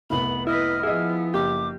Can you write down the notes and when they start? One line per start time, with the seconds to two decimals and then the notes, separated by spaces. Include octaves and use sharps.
0.10 F1 C2 B3 B5
0.47 E4 B4 D#5 F6
0.83 F3 B3 E4 G#4 D#5
1.34 F#1 G4 D6